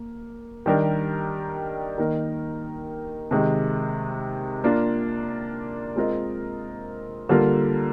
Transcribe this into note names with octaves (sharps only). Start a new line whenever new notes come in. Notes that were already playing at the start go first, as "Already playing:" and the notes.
Already playing: A#3
D#3 G3 D4 G4 A#4
D#3 A#3 D#4 A#4
C3 D#3 G#3
A#3 D4 F4
G#3 C4 F4 A#4 D#5
D3 G3 A#3 F4 A#4